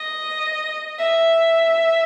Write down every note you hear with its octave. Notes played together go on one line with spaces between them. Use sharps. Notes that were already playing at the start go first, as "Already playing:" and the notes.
Already playing: D#5
E5